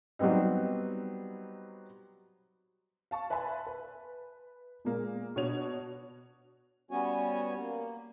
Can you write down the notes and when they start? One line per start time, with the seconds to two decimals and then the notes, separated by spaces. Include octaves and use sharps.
0.19 F#3 G3 B3 C4 D#4
3.11 F5 A5 C#6
3.30 B4 E5 G#5 A5 B5 C6
3.67 B4
4.85 A#2 G#3 A#3
5.36 B2 D4 C#5 F7
6.91 G3 B3 C#4 F#4 C#5 G#5
7.58 A#3